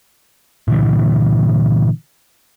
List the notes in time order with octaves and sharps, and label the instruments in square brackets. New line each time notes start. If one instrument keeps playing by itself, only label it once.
[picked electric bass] A#2 D3 E3